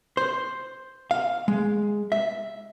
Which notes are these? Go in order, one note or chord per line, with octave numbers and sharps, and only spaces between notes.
C5
F5
G#3
E5